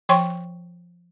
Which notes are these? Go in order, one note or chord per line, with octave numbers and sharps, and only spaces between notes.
F3 C#5 G5 C6 C#6